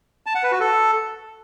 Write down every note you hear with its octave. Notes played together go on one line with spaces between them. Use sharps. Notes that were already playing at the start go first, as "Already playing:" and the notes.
A5
F#5
B4
F#4
A4